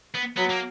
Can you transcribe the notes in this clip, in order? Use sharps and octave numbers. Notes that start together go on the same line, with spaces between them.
B3
F#3 B3
A#3